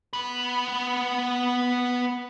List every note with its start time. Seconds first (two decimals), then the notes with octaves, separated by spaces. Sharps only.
0.13 B3 B4